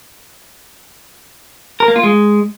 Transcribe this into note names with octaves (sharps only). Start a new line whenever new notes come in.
A#4
A#3
F4
G#3